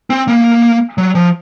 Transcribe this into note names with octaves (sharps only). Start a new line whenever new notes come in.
C4
A#3
F#3
F3